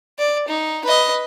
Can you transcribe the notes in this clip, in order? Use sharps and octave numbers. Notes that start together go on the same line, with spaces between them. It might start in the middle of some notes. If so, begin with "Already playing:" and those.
D5
D#4
B4 D#5